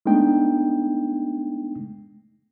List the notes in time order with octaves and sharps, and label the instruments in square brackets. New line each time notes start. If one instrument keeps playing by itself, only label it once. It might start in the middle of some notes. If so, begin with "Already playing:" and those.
[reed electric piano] G#3 A3 B3 D4 D#4 G5